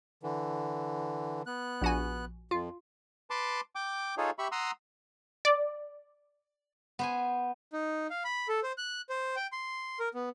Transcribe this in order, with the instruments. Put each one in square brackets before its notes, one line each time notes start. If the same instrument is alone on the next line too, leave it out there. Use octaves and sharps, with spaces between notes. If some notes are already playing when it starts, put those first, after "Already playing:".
[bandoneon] D3 E3
B3 F#6
[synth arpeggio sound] A#1 F#4 G#5
[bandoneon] F2 [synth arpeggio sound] F4
[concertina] B4 A5 C6 D6
G5 D6
D#4 F4 G#4 A4 C#5
G4 E5 B5 C#6
F#5 A#5 C6 D#6 E6
[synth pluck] D5
[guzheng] B3 C5 G#5
[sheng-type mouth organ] D#4
F5
B5
A4
C5
F#6
C5
G5
C6
A#4
B3